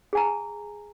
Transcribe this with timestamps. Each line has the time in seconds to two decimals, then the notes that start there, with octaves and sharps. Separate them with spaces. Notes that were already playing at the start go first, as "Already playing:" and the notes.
0.13 G#4 G#5 A#5